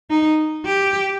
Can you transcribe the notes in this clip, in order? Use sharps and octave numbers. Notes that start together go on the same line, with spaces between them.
D#4
G4